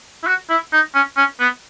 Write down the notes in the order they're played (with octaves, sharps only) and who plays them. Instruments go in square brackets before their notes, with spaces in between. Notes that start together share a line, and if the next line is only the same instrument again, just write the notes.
[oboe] E4
F#4
E4
D#4
C#4
C#4
B3